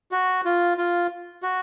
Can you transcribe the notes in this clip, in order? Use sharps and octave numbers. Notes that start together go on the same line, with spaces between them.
F#4
F4
F4
F#4